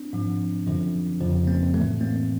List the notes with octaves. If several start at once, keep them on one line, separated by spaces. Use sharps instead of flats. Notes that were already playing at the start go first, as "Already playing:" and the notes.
Already playing: C4 D4
G#2 F3
F#2 D3 F3
F2 C#3 F3
A#3 C4
A2 E3 A3 B3
A#3 C4